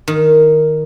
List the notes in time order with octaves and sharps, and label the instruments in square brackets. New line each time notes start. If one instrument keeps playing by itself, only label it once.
[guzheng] D#3